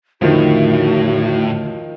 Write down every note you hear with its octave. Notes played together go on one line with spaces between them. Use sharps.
E2 A2 D3 D#3 F3 F#4